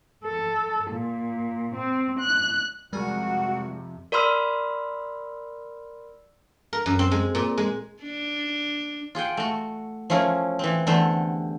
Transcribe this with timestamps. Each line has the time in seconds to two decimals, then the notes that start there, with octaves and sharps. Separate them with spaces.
0.25 A4
0.91 A#2
1.75 C4
2.19 F#6
2.93 F2 C3 G3 G#3 F#4 A#4 G#5
4.12 A#4 D5 B5 C6 E6 F6
6.73 A#4
6.86 F#2
6.99 C4
7.11 G#3
7.35 A#2
7.58 G#3
8.03 D4
9.15 F4 G#4 F#5 G5
9.37 A3 F#4
10.10 F3 A3 C#4 E4 A#4
10.59 E3 C4
10.87 E2 D3 G3 A3 A4 C5